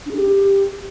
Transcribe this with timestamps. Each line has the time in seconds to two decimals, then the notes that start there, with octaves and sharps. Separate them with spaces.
0.06 D4
0.11 G#4
0.16 G4